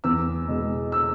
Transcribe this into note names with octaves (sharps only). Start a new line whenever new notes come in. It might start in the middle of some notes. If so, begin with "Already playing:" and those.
E2 E6
B2 G#3 B3
E6